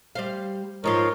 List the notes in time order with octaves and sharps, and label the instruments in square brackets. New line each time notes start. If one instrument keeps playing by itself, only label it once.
[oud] G3 C5 F5
[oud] G#2 F3 F4 [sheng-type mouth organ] A#4 C#5